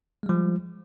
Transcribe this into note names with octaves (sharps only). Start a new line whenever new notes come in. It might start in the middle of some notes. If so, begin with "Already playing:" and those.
F3 G3 G#3